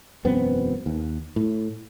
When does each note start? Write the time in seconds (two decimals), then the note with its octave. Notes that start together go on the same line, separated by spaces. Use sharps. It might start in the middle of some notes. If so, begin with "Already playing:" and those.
0.25 E1 F#2 B3 C4
0.86 D#2
1.36 A2